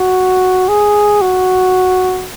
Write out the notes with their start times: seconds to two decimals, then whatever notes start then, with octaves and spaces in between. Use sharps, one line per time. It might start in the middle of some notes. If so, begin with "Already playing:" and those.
Already playing: F#4
0.68 G#4
1.21 F#4